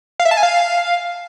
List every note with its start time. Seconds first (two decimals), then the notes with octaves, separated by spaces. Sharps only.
0.20 F5
0.25 E5
0.31 A5
0.37 G#5
0.43 F5